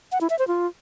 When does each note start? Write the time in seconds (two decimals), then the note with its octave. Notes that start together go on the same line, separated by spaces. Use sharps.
0.12 F#5
0.21 E4
0.30 E5
0.39 C5
0.48 F4